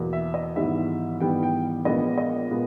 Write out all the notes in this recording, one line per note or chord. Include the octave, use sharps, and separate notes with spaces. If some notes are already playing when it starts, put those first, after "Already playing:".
Already playing: E2 B2 A#3
E5
D#5
G#1 G#2 E3 G3 B3 E5
G#1 G#2 E3 G3 B3 G5
G5
A#1 A#2 G#3 B3 D#5
D#5
A#2 G#3 B3